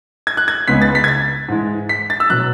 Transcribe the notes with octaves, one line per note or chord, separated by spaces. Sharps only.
G#6
F#6
G#6
C#2 C#3 G#3 B3 D#4 B6
A6
B6
G#6
A6
G#2 E3 G#3
B6
A6
E6
B2 F#3 F#6